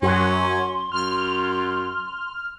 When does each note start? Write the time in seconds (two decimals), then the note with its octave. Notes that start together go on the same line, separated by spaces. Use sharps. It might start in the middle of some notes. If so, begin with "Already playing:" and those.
0.02 F#2 F#3 C#4 C6
0.92 F#2 F6